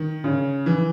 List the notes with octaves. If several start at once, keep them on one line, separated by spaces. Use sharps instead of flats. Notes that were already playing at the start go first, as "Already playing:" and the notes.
Already playing: D#3
C#3
E3